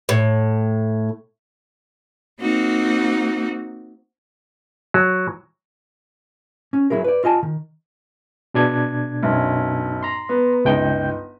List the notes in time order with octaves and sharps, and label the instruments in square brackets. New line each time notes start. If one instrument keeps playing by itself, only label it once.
[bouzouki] A2
[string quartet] A#3 C4 D#4 F#4
[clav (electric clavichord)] F#3
[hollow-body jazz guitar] C#4
F#3 E4 G#4 A#4
B4 D5
F4 D#5 G#5 A5
D#3
[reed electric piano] B2 D4 G#6
[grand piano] B1 F#2
[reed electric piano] A#5 C6
[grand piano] B3
[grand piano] G1 D#4 [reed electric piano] C#2 G5 G6